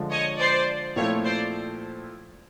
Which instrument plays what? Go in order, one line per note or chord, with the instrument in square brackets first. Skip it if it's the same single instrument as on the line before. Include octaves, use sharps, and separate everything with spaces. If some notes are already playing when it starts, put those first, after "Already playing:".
Already playing: [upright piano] D3 F3 G#3
[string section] C#5 D#5
C5 D5
[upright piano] A#2 F3 A3 C4 E4 [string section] C#5
[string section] C5 D5